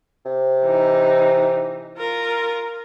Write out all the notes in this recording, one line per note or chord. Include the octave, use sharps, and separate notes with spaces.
C3
E3 D#4
F4 A#4